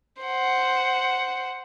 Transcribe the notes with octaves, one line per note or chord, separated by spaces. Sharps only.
C5 F#5